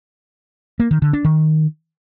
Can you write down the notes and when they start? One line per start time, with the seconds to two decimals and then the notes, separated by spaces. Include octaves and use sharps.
0.80 A#3
0.91 D#3
1.02 D3
1.13 D4
1.25 D#3